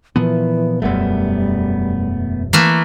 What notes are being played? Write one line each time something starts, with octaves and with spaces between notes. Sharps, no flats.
A#2 E3 F3 B3
E1 F#2 G3 A3 B3
E3 A3 A#3